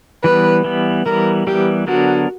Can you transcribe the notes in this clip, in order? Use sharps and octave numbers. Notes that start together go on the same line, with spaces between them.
E3 G3 B3 B4
E3 G3 B3
E3 G3 B3 A#4
E3 G3 B3 G4
D3 F#3 B3 D4 F#4 A#4